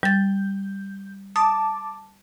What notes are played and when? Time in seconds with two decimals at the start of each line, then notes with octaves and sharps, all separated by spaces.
0.03 G3 G6 A6
1.36 A5 D6 D#6